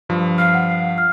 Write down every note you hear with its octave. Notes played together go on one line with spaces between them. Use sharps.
G2 F3
F5 F6
F#5
F6